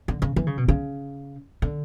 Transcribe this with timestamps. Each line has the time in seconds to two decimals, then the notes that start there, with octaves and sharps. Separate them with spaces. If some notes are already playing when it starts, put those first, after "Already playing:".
0.08 D3
0.22 C#3
0.36 E3
0.47 C#3
0.57 B2
0.68 C#3
1.62 D3